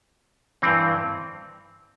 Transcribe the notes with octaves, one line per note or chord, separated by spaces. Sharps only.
G2 E3 C4